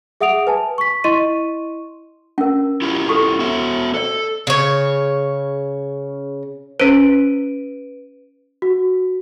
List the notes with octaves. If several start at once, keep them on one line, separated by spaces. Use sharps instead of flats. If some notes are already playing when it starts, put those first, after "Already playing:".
G#4 E5 F#5 D#6 D7 F7
B4 G#5 A5
C#6 B6
E4 D#5 C6 C#6 D#7
C#4 A#4
E4 F4 G4
A4 C#6
B3 F#4 E5
A4 C5 D5
C#3 C#5
C#4 B4 C5 D7 D#7
F#4